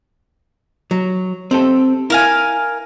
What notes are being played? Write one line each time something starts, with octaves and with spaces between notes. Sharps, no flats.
F#3
C4 G4 A4
E4 A#4 F5 G#5